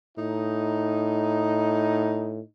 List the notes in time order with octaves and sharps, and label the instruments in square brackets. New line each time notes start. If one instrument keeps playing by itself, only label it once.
[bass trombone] A2 [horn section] D#4